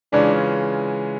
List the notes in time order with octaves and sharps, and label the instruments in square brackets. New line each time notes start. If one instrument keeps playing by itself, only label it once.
[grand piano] C#3 E3 G#3 C#4 F4 [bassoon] D4